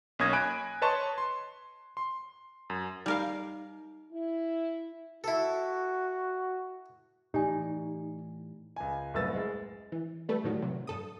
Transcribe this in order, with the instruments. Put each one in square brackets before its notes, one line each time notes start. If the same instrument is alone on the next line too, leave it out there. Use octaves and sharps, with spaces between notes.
[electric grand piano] B1 A#3 C#4 D#6 G#6 A#6
G#5 B5 F#6 G#6 D7
B4 C#5 D#5 A5 C6 C#6
C6
C6
F#2
[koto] G3 A#4 F5 [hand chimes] D#4
[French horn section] E4
[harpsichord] E4 A4 [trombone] F#4
[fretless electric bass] A2 E3 [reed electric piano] D#4 [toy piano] G4 D5 G#5
[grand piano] C#2 G#5
F#1 C2 A2 B4 E6 A6
G#3
[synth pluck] E3
G3 A3 A4 B4
A2 D#3 F#3 G3
C3 F#3
G2 A4 D#6